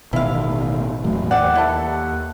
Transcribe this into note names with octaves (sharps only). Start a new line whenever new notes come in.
A1 B2 D#3 E4 F5
E2 A2 F#3
D#2 C4 D5 F#5
E4 A4